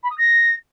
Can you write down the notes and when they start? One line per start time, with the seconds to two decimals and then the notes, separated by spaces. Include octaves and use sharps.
0.03 B5
0.10 D#6
0.18 A#6